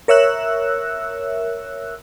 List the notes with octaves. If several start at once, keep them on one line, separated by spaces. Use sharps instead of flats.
A#4 C#5 E5 E6 F#6